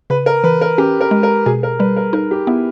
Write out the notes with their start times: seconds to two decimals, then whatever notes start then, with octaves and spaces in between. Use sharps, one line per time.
0.10 C#3 B4
0.26 A#4
0.44 E3 B4
0.61 A#4
0.78 C#4 G4
1.01 A#4
1.11 G#3
1.23 A#4
1.46 B2 G#4
1.63 A#4
1.79 G3 B4
1.96 A#4
2.13 D#4 A#4
2.31 G4
2.47 B3 E4